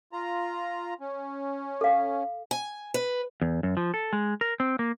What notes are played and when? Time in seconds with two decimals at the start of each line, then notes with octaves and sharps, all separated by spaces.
0.13 F4 A#5
1.00 C#4
1.81 A4 F5
2.51 G#5
2.94 B4
3.42 E2
3.63 F#2
3.77 F3
3.94 A4
4.13 G#3
4.41 A#4
4.60 C4
4.79 A#3